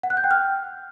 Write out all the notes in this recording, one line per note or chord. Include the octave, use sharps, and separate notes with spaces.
F#5
F#6
G6
G5
F6